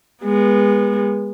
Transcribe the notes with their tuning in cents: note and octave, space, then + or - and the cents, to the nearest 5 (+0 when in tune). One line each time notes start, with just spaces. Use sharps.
G#3 -30 B3 -25